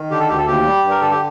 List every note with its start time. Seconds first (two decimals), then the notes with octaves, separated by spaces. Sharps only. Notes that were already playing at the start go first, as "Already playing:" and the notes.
Already playing: D#3
0.11 D3 G4
0.20 A4
0.29 D2 G4
0.38 A4
0.47 D#2 G4
0.66 G3
0.84 G2
0.91 A#4
1.01 D3 A4
1.11 G4